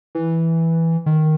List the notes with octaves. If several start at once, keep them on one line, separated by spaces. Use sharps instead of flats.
E3
D#3